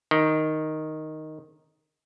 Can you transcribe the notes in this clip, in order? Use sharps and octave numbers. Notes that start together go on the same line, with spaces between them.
D#3